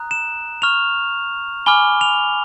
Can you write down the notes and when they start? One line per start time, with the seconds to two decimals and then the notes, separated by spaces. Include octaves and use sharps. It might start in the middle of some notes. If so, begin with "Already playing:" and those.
Already playing: A#5 D#6 F#6
0.11 E7
0.62 C#6 F6 F7
1.66 G#5 B5 D6 F6 G7
2.01 F7